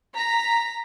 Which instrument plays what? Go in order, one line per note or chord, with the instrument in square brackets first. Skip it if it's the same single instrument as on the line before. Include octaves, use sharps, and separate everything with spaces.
[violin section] A#5 B6